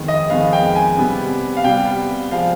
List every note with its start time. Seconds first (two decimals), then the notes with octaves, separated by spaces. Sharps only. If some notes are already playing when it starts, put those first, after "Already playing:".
Already playing: F2 D#3 G#3 B3
0.08 D#5
0.30 F2 D#3 G#3 B3 F5
0.53 G5
0.75 G#5
0.98 C3 G3 B3
1.57 F5
1.64 C3 G3 B3 G5
2.31 F3 G#3 F5